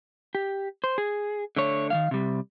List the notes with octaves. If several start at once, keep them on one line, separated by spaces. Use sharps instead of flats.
G4
C5
G#4
D3 A3 C#5
D#3 E3 F5
C3 G3